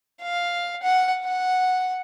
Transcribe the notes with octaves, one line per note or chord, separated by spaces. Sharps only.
F5
F#5
F#5